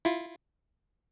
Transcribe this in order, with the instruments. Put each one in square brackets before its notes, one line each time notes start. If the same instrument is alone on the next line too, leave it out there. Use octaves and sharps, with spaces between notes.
[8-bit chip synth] E4 F4